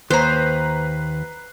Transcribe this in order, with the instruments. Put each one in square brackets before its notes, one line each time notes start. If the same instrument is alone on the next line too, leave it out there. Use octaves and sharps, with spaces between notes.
[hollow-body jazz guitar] D#2 [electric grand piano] B4 A#5 [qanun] C5 [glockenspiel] F#6 C7